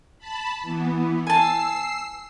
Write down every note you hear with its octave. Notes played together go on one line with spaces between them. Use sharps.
A5 B5
E3 B3
G#5 A5 E6 C7